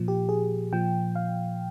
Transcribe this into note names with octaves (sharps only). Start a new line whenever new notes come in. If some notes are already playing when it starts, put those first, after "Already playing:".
Already playing: A#2 F3
G4
G#4
A#2 F3 G5
F5